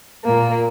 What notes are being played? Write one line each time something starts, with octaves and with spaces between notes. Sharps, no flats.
A#2 A#3